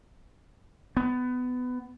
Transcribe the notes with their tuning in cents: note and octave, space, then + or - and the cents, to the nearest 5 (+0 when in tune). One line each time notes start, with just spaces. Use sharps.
B3 +20